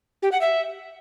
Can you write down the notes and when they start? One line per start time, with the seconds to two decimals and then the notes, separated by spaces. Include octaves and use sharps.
0.22 G4
0.32 F#5
0.41 E5